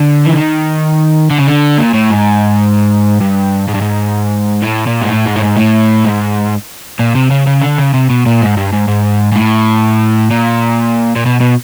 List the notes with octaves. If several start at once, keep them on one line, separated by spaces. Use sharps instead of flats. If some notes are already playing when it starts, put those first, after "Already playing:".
Already playing: D3
E3
D#3
D3
C#3
D3
A#2
A2
G#2
G2
G#2
G2
G#2
A2
A#2
G#2
A2
G#2
A2
G#2
A2
G#2
A#2
C3
C#3
C#3
D3
C#3
C3
B2
A#2
G#2
G2
G#2
G#2
G#2
A2
A#2
A#2
B2
B2